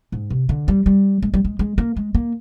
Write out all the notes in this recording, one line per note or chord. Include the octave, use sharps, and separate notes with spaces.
G#2
C3
D3
G3
G3
G#3
G3
G#3
G#3
A#3
G#3
A#3